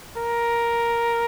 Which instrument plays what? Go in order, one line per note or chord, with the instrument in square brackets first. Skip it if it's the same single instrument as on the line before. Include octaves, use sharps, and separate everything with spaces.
[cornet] A#4